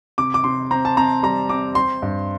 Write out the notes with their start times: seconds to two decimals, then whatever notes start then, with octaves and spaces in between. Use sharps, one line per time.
0.18 C3 D6
0.34 D6
0.44 C3 C6
0.71 C4 A#5
0.85 A5
0.97 C4 A#5
1.23 G3 A#5
1.49 C4 D6
1.75 C4 C6
2.02 G2